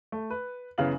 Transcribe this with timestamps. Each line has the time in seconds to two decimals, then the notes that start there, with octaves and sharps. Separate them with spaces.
0.12 A3
0.30 B4
0.78 F#2 C#3 E3 B3 F5 F#7